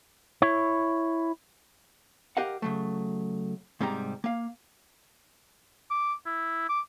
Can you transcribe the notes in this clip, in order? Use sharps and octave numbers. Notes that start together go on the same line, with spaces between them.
E4 C#5
G4 A#4 D#5 F5 F#5
C#3 F#3 A3
G#2 C3 G3 G4 A#5
A#3 F5
D6
E4
D6